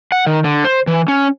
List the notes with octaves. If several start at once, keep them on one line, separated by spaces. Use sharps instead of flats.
F#5
D#3
D3
C5
E3
C#4